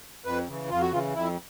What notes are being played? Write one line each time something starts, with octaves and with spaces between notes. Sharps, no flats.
F2 B4
C#3 E3
F2 F4
F#4
C#3 E3 F4
F2 E4